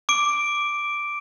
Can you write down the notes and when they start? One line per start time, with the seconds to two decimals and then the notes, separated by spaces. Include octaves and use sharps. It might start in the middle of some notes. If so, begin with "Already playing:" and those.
0.09 D6 D7